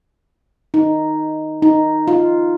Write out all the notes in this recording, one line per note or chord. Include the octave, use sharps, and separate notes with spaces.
D#4
D#4
F4